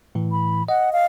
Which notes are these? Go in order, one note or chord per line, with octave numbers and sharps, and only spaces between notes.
A2 E3
B5
D#5 F#5
F5